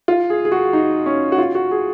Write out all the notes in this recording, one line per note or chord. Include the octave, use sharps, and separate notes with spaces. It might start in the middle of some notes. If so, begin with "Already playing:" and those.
F4
G#4
G#4
F#4
D#4
C#4
F#4
F4
F#4
G#4